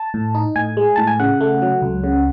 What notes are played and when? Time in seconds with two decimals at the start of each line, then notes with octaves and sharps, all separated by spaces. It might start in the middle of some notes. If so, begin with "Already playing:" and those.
Already playing: A5
0.14 A2
0.35 D#4
0.56 A2 G#5
0.77 G#3
0.96 A2 A5
1.07 G#5
1.20 C#3 F#5
1.41 A3
1.62 F#3
1.82 C#2
2.04 C#3